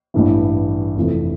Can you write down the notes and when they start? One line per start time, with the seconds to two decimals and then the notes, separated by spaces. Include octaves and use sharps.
0.14 A1 G2 E3
0.97 F1 F2 C3 E3 A3